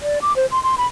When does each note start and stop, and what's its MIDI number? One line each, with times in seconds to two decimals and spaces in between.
0.02 0.19 74
0.22 0.35 86
0.36 0.46 72
0.51 0.62 84
0.63 0.75 84
0.78 0.87 83